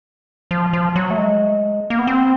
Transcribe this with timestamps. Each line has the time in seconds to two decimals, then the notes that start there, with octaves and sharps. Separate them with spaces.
0.51 F3
0.73 F3
0.96 F#3
1.11 A3
1.18 G#3
1.90 A#3
1.99 B3
2.07 C4